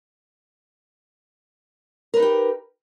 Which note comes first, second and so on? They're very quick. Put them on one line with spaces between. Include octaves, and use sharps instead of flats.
A#4 B4 D#4 G4